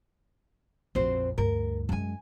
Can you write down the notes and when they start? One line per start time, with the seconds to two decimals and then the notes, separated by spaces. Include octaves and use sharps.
0.95 A#1 F2 C4 F#4 C5
1.38 D2 G2 A#4
1.89 F#2 G#3 G#5 A5